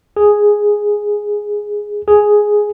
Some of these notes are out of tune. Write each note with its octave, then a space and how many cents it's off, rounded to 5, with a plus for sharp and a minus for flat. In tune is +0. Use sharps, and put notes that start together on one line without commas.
G#4 +0
G#4 +5